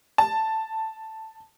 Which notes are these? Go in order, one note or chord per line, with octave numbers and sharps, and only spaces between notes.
A5